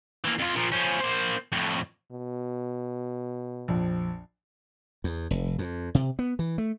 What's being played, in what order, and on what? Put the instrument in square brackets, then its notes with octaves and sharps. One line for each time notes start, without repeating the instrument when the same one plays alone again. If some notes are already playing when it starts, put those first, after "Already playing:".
[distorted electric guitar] E3 A#3
F2 F4
A#2 F3
F3 C#4
A#3 C5
F2 A2
[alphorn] B2
[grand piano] A#1 F2
[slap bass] E2
F1
F2
C3
B3
E3
A3